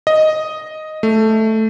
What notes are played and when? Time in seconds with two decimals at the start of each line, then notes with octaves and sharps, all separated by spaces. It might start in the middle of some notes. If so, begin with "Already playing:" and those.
0.07 D#5
1.03 A3